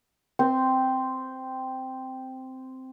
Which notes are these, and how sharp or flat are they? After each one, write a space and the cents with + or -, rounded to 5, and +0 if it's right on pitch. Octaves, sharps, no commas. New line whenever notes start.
C4 -5